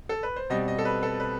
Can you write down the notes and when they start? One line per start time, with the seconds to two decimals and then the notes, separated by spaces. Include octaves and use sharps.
0.09 A4
0.23 B4
0.36 C5
0.50 B2 G3 C4 D#5
0.68 D#5
0.78 A4
0.85 B4
1.03 A4
1.20 B4